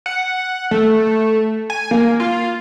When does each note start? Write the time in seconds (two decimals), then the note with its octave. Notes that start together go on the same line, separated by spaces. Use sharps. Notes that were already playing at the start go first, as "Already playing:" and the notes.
0.06 F#5
0.71 A3
1.70 G#5
1.91 A#3
2.20 F4